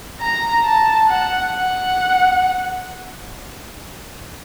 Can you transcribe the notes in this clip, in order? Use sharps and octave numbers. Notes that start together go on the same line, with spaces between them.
A#5
A5
F#5
F#5